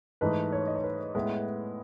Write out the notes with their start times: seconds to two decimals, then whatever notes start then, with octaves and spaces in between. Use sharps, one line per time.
0.21 G#2 E3 A3 D#4 B4
0.52 C#5
0.67 D#5
0.76 C#5
0.84 B4
1.15 A2 G#3 B3 B4